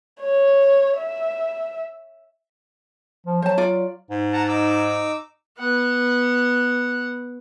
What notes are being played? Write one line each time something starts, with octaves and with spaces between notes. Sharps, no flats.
C#5
E5
F3
F#3 C5 A5
F4 D5
G#2
F#5 A5 A#5
D#4 D6 E6
B3 F#5